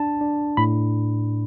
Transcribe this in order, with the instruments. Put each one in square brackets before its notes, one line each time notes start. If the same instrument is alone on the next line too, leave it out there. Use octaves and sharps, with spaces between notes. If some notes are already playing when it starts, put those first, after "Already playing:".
Already playing: [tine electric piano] D4 A5
D4
A2 B5